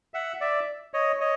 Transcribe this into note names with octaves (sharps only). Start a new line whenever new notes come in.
E5 F#5
D5 E5
C#5 D#5
C#5 D#5